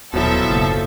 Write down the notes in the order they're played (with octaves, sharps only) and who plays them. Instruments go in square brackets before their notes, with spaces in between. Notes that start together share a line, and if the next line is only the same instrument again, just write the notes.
[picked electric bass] D#1 [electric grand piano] B2 F#3 E4 [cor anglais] F3 [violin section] A4 E5
[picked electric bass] F#1 C#3 A#3